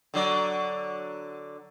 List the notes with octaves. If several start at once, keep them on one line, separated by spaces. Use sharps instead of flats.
D3 F#3 D5